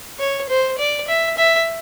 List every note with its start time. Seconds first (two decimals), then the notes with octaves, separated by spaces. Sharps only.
0.19 C#5
0.49 C5
0.78 D5
1.08 E5
1.37 E5